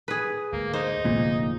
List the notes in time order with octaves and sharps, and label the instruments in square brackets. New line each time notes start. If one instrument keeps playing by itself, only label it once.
[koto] G#4 B4
[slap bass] D2 G#2 [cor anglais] A#3
[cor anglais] D#4 [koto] C5
[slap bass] F1 D3 A#3 [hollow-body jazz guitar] A#2